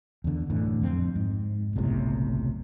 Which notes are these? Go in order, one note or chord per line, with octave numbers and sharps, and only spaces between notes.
E2 D3
F#2 A2 D3 E3
F2 C4
G#2
F#1 B1 A2 C3